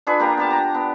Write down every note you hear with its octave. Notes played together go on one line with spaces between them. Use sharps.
D4 F4 G#4 B4
A#3 G4 A#5
B3 G4 A5
A#5
B3